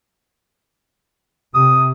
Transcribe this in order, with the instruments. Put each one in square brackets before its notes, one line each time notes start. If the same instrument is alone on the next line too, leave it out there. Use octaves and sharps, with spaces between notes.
[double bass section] C3 [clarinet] D#6